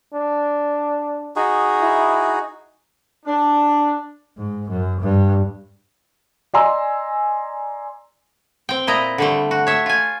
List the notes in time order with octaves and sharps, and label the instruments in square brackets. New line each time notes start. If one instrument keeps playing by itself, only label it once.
[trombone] D4
[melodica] D#4 F#4 G#4
[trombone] E4
[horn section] D4
[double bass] G#2
F#2
G2
[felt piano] D5 D#5 G#5 A#5 C6 E6
[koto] C4 G5
A#2 E4 D#5 A#5
D3 G3 A3
F#4
C#5 E5 A5
F4 G#5